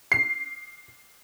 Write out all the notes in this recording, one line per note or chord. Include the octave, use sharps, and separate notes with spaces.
C7